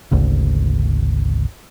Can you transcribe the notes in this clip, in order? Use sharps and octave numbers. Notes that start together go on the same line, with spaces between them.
G#1 D2 C#3